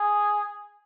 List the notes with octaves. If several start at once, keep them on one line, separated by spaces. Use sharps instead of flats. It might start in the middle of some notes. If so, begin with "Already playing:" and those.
Already playing: G#4